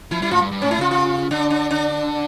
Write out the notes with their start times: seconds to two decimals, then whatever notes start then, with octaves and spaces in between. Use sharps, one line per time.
0.11 F3 E4
0.22 G3 E4
0.31 A2 F4
0.41 G2
0.51 G2
0.62 A2 C#4
0.71 E4
0.78 C#3 F4
0.91 F4
1.31 D3 D4
1.50 D4
1.71 D4